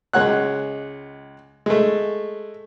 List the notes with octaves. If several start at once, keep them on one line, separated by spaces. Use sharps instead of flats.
C#2 G#3 C#5 F#5 F#6
G#3 A3